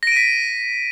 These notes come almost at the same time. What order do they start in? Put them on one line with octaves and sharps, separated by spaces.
A#6 D7 D#7 B6